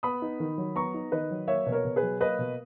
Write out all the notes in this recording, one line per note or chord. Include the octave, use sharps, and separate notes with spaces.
B3 B5 D#6
D#4
D#3
F#3
B3 A#5 C#6
D#4
D#3 B4 D#5
F#3
A#3 C#5 E5
B2
A#4 C#5
B2
G#4 B4
F#3
A#3 B4 D#5
B2